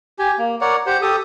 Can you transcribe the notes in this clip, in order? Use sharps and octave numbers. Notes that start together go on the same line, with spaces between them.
G4 G#5
A#3
A#4 C#5 D5 F#5
G4 C5 F#5
G4 A4 D#6